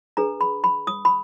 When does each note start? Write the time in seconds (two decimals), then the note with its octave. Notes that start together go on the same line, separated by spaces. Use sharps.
0.17 D4 G#4 B4 A#5
0.41 B5
0.64 B5
0.87 D#6
1.05 B5